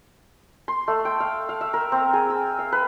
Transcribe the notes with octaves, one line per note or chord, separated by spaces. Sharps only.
C6
A3
G5
F5
F5
E5
A#4
C4
G#4
E6
F5
B4